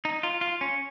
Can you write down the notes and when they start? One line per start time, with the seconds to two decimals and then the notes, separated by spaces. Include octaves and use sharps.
0.05 D#4
0.23 F4
0.41 F4
0.61 C#4